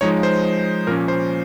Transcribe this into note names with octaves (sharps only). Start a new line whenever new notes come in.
F3 G#3 D#4 C#5
C5
A#2 F3 A#3 C#4 A#4
C5